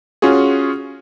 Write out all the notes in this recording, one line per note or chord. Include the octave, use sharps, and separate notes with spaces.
C#4 F4 F#4 G#4